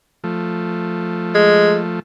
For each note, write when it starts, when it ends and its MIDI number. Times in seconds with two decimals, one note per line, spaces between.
0.24 2.00 53
0.24 2.00 57
1.35 1.80 56